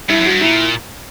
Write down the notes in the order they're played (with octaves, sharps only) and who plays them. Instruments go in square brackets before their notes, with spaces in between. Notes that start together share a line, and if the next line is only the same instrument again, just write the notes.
[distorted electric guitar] G2 [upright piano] E4
[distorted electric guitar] F#2
[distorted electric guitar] G2 [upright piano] F#4
[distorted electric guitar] A#2 [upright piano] E4